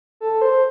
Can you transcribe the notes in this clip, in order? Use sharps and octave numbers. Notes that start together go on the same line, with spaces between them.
A4
C5